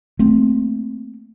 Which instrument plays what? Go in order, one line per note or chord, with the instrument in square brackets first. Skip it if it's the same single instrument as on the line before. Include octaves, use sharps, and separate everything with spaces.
[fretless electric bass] A3 A#3 C4